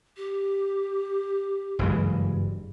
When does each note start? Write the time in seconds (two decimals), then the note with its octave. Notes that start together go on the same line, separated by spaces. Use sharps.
0.17 G4
1.79 F#1 G2 E3 G#3